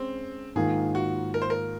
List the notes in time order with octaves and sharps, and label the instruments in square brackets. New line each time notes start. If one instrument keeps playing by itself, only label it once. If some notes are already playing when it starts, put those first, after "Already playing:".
Already playing: [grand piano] G#3 C#4 [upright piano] C4
[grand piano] G#2 D#3 A#3 F4 [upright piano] G#4
[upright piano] F#4
A#4
C5
A#4